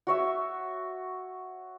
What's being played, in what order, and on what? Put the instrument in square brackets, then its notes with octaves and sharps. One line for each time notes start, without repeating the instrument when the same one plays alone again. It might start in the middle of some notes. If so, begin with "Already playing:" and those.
[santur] F#4 C#5 E5